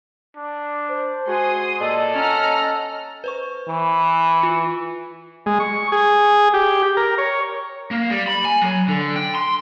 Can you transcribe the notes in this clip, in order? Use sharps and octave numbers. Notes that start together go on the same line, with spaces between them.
D4
C5
G#3 F#4 G#5 C6 D#6
A#2 A4 D5 D#5
C#4 F#5 A#5 F6
B4 C5 C#6
E3
F4 C#7
G#3
C#6
G#4
G4
A#4
C#5
A#3
G3
B5
G#5
F#3
D3
G5
C6